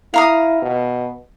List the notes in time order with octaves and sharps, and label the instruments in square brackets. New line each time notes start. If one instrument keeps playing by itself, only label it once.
[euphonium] E4 [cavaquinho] F5 A#5 D#6
[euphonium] B2